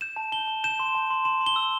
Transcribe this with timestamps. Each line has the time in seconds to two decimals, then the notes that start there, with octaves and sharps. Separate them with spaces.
0.01 G6 E7
0.16 A5
0.32 A5 G7
0.47 A5
0.64 G6 E7
0.79 C6
0.95 A5
1.10 C6
1.25 C6 E7
1.41 C6
1.46 G7
1.56 E6